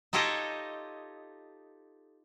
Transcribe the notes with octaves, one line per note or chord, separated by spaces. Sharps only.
D#4 F4 G4 A4 C#5 D#5